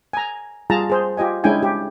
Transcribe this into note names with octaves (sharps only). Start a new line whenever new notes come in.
G#5 A#5
G3 F4 G#4 A5 A#5
G#4 C5
F4 G4 D#5 G#5
G#3 C#4 D4 E4 G5 G#5
G4